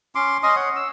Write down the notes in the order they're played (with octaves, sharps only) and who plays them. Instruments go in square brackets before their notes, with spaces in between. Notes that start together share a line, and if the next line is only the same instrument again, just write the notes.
[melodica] C#4 C6 D6
C#4 D#5 C6 D#6
C#5 F#5
E6